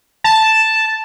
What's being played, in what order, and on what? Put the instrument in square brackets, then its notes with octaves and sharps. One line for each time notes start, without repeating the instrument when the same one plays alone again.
[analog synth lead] A5